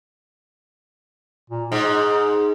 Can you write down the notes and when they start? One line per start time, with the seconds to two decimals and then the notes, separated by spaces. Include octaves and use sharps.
1.50 A#2
1.72 G#2 D#4